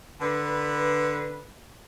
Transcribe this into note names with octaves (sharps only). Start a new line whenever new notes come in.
D3 B4